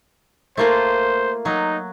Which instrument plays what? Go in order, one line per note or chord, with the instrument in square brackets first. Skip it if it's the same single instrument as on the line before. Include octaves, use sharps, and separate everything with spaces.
[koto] A3 A#3 F4 [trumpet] C5
[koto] F#3 [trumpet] D#4